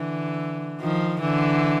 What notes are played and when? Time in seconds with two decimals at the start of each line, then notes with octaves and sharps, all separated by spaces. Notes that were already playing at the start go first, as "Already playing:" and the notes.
Already playing: D3 E3
0.81 D#3 F3
1.21 D3 E3